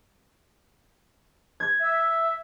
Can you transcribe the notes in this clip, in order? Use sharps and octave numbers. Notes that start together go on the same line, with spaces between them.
G#6
E5